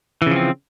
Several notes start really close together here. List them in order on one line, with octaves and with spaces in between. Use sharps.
E3 C#3 F3 C4